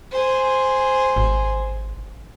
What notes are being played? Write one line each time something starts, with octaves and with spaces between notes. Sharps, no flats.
G#4 C5
G#1